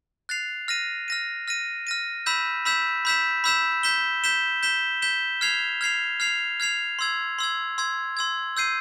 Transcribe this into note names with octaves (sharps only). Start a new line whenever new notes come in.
F#6 A6 C7 F7
F6 A#6 D#7
F6 A#6 D#7
F6 A#6 D#7
F6 A#6 D#7
B5 E6 G6 B6 E7
B5 E6 G6 B6 E7
B5 E6 G6 B6 E7
B5 E6 G6 B6 E7
G6 B6 E7 G7
G6 B6 E7 G7
G6 B6 E7 G7
G6 B6 E7 G7
F6 G#6 C7 F7
F6 G#6 C7 F7
F6 G#6 C7 F7
F6 G#6 C7 F7
C6 E6 G#6
C6 E6 G#6
C6 E6 G#6
C6 E6 G#6
E6 G6 C7 D#7